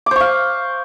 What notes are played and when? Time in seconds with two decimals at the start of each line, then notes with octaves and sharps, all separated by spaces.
0.06 D6
0.11 C5
0.16 C#6
0.20 F5